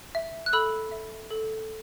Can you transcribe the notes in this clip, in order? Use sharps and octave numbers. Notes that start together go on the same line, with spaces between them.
E5
F#6
A4 B5 E6
E5
A4